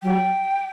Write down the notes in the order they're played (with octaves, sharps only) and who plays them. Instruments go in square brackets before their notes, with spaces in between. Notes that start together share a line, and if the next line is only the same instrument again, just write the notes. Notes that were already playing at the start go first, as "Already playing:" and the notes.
[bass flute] F#3 [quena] G5